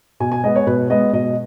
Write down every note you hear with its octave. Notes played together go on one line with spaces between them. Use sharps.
B2 G#5
G#5
G#3 B3 D#5
C#5
B2 B4
G#3 B3 D#5
B2 D#5